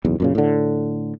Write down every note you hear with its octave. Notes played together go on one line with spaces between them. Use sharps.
F#1 B1 E2
F#2 A#2 C#3
A2 D3